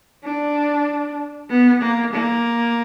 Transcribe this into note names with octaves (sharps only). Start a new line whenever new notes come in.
D4
B3
A#3
A#3